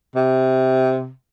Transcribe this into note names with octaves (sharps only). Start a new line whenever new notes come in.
C3